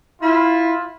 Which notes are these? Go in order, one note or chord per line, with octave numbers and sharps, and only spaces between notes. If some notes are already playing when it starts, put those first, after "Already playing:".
E4 F4